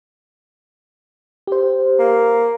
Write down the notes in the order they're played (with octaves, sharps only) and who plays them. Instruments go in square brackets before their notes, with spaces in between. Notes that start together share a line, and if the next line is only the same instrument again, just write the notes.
[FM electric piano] G4 C5
[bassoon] A#3